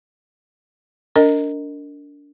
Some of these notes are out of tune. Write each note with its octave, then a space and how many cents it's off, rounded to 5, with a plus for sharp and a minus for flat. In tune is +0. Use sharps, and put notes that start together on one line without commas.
D4 -30 A#4 -25 D#5 +0